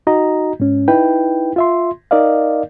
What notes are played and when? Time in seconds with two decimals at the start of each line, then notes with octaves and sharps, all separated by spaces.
0.07 D#4 F#4 D#5 A#5
0.60 G#2 C#4
0.88 D#4 E4 B4 G5
1.56 F4 E5 C6
2.11 D#4 A#4 D5 D#5 F5